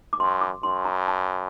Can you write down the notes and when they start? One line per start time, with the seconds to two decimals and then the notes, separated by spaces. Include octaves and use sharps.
0.13 D6
0.20 F#2 C6
0.41 D6
0.63 F#2 C6
0.85 A#5
1.08 A5